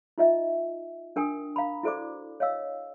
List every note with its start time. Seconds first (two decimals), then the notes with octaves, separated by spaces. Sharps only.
0.18 D#4 F4 D#5 E5
1.16 D4 A#4 G5 G#5 D#6
1.56 F5 A#5 B5
1.83 E4 F#4 A4 C5 D5 D6
2.40 C#5 D#5 F5 E6